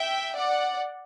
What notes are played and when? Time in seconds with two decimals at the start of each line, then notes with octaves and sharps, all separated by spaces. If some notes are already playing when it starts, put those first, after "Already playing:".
Already playing: E5 G5
0.36 D5 F#5